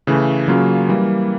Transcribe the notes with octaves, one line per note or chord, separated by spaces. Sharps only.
C#3 E3 A3
C#3 F#3 A#3 C#4 F4
E3 G3 A#3